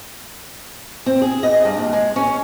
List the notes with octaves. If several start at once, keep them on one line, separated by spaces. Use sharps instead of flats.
C4
G#4
D#5
G2
D#2
G#3
C#4